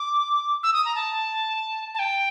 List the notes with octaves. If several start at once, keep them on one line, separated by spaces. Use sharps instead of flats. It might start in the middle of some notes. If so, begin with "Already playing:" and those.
Already playing: D6
E6
D#6
A#5
A5
A5
G5